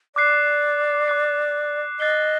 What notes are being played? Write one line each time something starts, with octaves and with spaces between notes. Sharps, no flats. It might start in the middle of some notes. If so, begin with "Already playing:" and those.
D5 D6 F#6 C7
D6 F#6 C7
D#5 F#6 A6 C7 G7